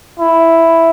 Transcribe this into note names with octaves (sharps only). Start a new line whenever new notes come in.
E4